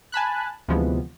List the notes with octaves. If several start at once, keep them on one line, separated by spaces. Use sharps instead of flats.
G#5 A5 B5 F#6
D2 C3 E3 F3 G#3 B3